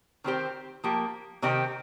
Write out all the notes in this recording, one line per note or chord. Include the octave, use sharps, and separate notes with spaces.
D#3 C4 G4 C5
F3 A#3 G4
C3 D#3 C4 D#4 G4